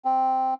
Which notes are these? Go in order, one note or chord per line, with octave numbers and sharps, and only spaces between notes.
C4